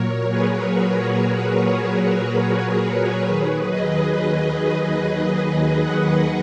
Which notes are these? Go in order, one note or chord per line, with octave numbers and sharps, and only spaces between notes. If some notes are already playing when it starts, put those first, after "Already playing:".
Already playing: A#2 F#3 A#4 C#5
G#4 B4
F#4 A#4
G#4 B4
G#4 B4
F#4 A#4
F#4
G#4
F#4
G#4
D#2 D#3 F#3 G#4 B4
B4 D#5
D#5 F#5